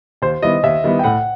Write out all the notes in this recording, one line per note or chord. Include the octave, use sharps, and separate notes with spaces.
D#2 C5
D#3 G3 B3 E4 D#5
D#2 E5
D#3 G3 B3 E4
G5
A2 F#5